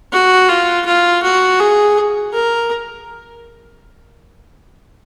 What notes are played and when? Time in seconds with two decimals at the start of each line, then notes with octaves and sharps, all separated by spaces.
0.13 F#4
0.49 F4
0.86 F4
1.23 F#4
1.60 G#4
2.33 A#4